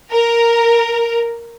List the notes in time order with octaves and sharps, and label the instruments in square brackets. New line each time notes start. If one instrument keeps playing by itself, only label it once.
[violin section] A#4